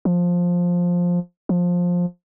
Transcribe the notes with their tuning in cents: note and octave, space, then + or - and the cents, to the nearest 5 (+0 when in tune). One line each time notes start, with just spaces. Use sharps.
F3 +10
F3 +15